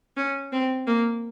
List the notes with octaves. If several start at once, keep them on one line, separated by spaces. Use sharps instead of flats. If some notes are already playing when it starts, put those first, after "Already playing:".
C#4
C4
A#3